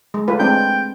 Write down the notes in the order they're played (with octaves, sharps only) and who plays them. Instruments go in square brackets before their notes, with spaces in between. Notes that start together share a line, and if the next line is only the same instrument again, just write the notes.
[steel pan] G#3
A3 F4 B4
[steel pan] G#3 C4 D4 [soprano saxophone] G5